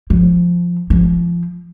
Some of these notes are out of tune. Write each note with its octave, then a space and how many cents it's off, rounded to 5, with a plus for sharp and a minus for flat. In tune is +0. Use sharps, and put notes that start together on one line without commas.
F3 +0
F3 -20